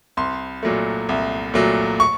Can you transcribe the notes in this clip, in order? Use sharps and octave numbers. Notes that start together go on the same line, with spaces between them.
C2 C6
A#2 F#3 A3
C2
A#2 F#3 A3
C#6